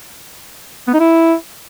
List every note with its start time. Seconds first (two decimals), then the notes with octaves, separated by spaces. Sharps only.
0.87 B3
0.94 D#4
1.00 E4